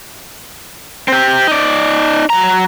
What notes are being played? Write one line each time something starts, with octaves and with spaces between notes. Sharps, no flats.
C4 G4
D#4 D5
F#3 A#5